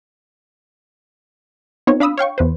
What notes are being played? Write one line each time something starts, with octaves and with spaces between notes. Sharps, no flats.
B3 C4 D#4 F4 C#5
D4 F5 B5 D#6 E6
C#5 F5 G5 C#6
E2 B4 C5